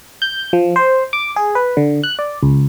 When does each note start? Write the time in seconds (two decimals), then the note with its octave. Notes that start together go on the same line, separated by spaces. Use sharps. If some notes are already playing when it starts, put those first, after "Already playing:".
0.22 G6
0.53 F3
0.76 C5
1.13 D6
1.36 G#4
1.55 B4
1.77 D3
2.04 F#6
2.19 D5
2.43 C#2